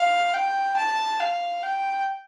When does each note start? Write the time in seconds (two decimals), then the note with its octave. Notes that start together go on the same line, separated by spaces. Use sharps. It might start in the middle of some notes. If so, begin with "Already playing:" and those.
Already playing: F5
0.33 G5
0.76 A5
1.20 F5
1.62 G5